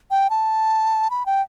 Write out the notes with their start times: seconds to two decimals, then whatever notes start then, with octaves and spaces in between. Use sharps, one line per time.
0.11 G5
0.30 A5
1.10 B5
1.26 G5